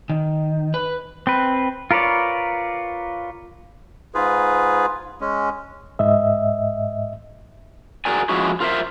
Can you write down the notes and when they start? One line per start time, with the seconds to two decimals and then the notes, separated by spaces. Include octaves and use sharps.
0.09 D#3
0.74 B4
1.27 C4 B4
1.91 F4 A#4 B4 C#5 D5
4.15 G#2 F4 G#4 B4
5.21 G#3 C#4
5.99 G#2 D#5 E5
8.05 F#4 G#4 A#4 D5 G#5
8.29 F3 G#3 C#4 E4 F#4
8.61 F4 A#4 C5 E5